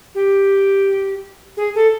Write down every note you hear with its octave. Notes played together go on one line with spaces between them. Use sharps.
G4
G#4
A4